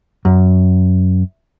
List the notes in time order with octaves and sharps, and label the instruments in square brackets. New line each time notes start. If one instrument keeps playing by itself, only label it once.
[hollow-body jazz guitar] F#2